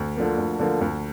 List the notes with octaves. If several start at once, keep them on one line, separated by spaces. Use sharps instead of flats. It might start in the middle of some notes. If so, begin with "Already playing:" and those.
Already playing: D2
D3 F3 A#3
D2
D3 F3 A#3
D2